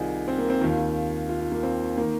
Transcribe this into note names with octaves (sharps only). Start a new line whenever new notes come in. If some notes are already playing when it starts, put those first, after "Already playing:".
Already playing: C2 C3 D#3 D#4 F4 G#4
C4
A#3
C4
D#2 D#3 F4
F4
F4
F4
A#3
C4
D#3 A#3